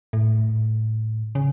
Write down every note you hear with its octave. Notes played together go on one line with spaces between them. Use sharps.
A2
C#3